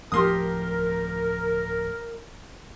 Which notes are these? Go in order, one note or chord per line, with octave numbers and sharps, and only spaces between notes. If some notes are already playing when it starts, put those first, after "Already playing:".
D1 F3 A3 G4 A#4 C6 D#6